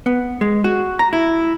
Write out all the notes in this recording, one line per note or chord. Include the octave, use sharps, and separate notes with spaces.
B3
G#3
F#4
A#5
E4